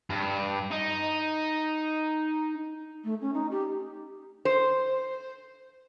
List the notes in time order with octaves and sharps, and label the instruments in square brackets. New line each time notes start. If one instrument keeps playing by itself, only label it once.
[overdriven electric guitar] G2
D#4
[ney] A3
C#4
D#4
G4
[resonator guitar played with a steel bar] C5